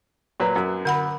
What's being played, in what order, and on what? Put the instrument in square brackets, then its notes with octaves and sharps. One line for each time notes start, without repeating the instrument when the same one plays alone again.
[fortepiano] A#2 F#3 B4
F#2
[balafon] D3 F#5 B5